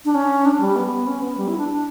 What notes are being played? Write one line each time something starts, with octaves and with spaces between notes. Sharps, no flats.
D4
C#4
D4
G3
B3
C#4
B3
G3
E4
D4
D4